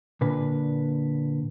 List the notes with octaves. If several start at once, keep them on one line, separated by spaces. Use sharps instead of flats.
A#2 D3 B4